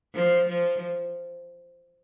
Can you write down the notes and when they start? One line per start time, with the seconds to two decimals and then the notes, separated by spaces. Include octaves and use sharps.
0.14 F3
0.48 F3